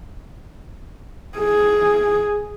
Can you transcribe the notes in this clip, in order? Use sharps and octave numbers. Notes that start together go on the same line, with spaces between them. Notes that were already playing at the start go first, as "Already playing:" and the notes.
G#4